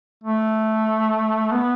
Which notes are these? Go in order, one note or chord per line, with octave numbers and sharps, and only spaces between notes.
A3
B3